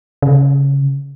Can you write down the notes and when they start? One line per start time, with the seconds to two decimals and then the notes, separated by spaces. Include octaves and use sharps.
0.22 C#3